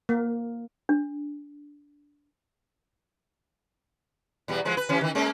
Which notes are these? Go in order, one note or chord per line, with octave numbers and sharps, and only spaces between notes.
A#3
D4
E2 B2 G3
E3 F3 G#3
B4
E3 C#4 G4
D#3 E3
G#3 A#3 C#4